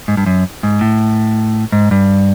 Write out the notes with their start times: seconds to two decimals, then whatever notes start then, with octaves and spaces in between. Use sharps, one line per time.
0.08 G#2
0.17 G2
0.26 F#2
0.63 G#2
0.81 A2
1.72 G#2
1.91 G2